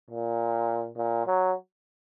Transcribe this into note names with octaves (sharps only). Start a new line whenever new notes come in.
A#2
A#2
F#3